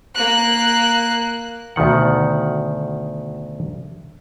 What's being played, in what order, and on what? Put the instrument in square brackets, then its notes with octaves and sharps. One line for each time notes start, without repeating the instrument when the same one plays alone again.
[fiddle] A#3 F#6
[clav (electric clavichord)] D2 B2 D#3 F#5